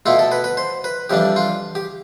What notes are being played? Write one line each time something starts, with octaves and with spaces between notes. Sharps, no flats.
B2 A3 E4 F4
A4
B4
B4
C5
B4
F2 E3 G3 D4 G4
F4
G4